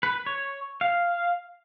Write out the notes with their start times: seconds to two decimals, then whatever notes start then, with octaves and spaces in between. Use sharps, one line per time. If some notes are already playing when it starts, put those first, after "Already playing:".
0.03 B4
0.26 C#5
0.81 F5